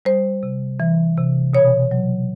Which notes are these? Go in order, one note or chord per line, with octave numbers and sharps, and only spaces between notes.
G3 C5
C3
E3
C3
B2 C#5
F#3